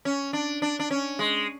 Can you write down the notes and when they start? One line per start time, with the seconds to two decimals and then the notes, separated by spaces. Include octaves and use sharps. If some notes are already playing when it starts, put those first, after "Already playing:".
0.05 C#4
0.33 D4
0.62 D4
0.79 D4
0.91 C#4
1.19 G#3